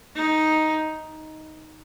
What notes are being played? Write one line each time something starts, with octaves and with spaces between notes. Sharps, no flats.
D#4